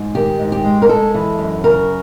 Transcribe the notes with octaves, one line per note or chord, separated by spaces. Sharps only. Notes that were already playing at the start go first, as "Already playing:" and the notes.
Already playing: G#2
D#3 G4
G#2
G4
G#3
A#4
G#3 A4
E3
F#2
C#3 A#4